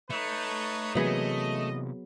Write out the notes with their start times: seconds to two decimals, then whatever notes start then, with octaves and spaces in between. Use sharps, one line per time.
0.10 A3 D#4 B4 C#5
0.95 C3 E3 F#3 A#3 B3 G#4 D#5